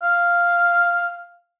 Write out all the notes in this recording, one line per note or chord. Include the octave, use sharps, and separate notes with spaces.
F5